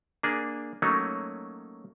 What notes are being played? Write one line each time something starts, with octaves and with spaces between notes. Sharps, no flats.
A#3 D4 G#4
F#3 A3 A#3 C#4 D#4